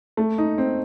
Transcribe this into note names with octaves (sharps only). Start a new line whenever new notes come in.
A3
D#4
C4